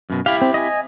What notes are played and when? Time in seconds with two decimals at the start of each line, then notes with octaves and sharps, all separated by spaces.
0.10 F#2 B2
0.26 E4 G4 F5
0.41 C4
0.54 D#5 G#5